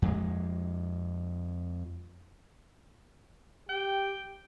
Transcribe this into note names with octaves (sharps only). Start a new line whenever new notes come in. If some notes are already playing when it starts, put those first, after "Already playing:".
F2 G#3
G4 G5